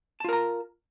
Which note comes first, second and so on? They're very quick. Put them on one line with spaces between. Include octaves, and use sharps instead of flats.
A5 F4 A#4 A#5